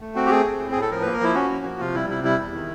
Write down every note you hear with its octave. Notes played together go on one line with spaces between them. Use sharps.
A3
C4 F#4
G4
A3 G#4
C4
A2
A2 G#4
A4
F3 A#4
A#3 B4
A#4
F3 E4
C#4 F#4
A#3
F3
C3 F4
G3 E4
C3 E4
G3 E4
E2
D#3